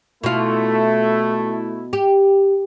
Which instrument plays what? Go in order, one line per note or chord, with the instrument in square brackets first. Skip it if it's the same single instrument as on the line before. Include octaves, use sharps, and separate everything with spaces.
[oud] B2 F4 [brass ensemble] A3 E4
[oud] G4